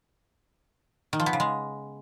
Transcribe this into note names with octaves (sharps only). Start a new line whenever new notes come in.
D#3
F3
B3
C#3
G#3